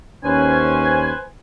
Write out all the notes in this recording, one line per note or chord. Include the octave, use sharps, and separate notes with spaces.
D#2 C#4 B4 C5 G#5